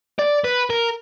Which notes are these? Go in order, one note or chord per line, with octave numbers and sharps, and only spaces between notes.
D5
B4
A#4